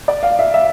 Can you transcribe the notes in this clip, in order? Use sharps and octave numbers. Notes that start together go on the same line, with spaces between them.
D5
F5
E5
E5